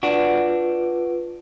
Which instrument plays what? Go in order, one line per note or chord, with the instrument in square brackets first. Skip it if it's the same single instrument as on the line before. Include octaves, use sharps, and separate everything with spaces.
[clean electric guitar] D4 F#4 [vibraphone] F4 B4